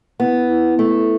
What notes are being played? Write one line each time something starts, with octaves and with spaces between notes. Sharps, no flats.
B3 E4
E4
A3 E5